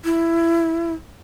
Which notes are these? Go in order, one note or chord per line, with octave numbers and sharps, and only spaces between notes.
E4